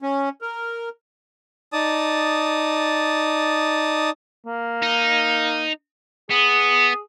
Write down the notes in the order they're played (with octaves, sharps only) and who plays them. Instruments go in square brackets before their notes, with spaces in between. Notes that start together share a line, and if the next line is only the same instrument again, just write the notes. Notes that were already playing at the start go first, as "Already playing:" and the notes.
[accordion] C#4
A#4
[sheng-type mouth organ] D#4 D5 A5 D#6
[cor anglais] A#3
[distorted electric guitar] D#4
[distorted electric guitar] B3 [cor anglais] G#4